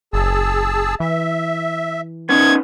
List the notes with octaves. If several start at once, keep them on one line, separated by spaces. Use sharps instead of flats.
F#1 G#4 A5 E6
E3 E5
B3 C#4 D#4 G#6